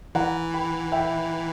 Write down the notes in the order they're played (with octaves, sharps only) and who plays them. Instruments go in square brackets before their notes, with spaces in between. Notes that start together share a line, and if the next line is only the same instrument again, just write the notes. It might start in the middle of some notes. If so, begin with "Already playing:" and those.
[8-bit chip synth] E3 [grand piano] F#5 A#5
[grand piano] G5 B5
E5 G5